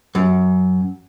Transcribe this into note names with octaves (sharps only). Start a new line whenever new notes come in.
F#2